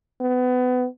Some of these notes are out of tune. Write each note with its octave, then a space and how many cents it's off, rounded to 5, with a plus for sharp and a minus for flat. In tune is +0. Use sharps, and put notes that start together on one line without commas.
B3 +25